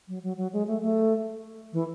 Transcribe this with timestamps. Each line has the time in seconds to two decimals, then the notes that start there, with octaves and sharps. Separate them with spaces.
0.08 F#3
0.23 F#3
0.37 F#3
0.53 G#3
0.67 A3
0.82 A3
1.73 E3